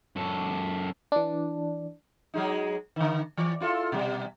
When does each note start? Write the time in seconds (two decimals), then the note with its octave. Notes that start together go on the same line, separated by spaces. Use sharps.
0.16 F#2 A4
1.12 E3 D4
2.34 F#3 G#3 D#4
2.96 D3 D#3
3.37 E3 D5
3.61 E4 F4 A4
3.92 B2 G3